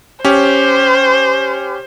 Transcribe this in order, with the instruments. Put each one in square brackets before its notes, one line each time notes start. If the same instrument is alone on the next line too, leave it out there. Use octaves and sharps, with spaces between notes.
[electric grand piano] C#4 G4 [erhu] C5